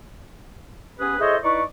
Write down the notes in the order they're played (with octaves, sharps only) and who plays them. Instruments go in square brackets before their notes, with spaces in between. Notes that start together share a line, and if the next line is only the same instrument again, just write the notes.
[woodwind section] B3 C#4 G4 G#4 B4
E4 G#4 A4 C5 C#5 D#5
D#4 E4 B4 D5 C#6